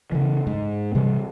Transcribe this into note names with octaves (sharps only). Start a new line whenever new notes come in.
C#3 E3
G#2
C3 E3 G3